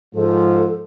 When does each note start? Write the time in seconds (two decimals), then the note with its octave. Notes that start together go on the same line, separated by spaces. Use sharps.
0.15 G#2 F3 A4